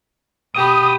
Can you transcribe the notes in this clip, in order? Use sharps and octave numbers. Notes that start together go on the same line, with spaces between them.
B2 G4 B5 D#6